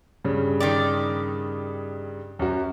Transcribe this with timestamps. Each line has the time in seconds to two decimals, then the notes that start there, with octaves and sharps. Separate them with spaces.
0.25 G2 C#3
0.60 D#3 G4 D5
2.39 F#2 F#4